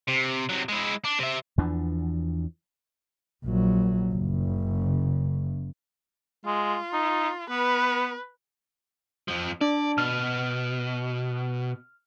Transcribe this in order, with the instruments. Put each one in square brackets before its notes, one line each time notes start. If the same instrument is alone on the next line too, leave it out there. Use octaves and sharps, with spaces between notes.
[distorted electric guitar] C3
C3 F#3
G#3 E4
D4
C3 E5
[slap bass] E2 E3 F3 D4
[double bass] A#1 F#3
F#1 C#3
[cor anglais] G#3 [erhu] F4
[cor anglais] D#4
[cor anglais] B3 [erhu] B4
[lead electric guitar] F2 F3
[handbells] D4 [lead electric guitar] D5
[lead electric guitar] B2 [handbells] F6